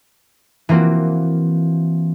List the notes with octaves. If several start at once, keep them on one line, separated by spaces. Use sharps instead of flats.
E3 A#3 C4 F4 F#4